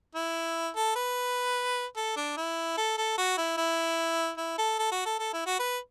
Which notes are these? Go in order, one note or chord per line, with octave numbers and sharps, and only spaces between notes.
E4
A4
B4
A4
D4
E4
A4
A4
F#4
E4
E4
E4
A4
A4
F#4
A4
A4
E4
F#4
B4